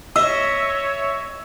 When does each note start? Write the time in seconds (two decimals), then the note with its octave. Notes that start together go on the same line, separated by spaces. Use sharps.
0.16 C#5 D#5 E5 E6